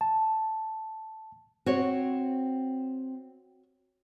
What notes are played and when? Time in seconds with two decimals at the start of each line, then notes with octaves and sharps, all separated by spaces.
0.01 A5
1.66 C4 F#4 C#5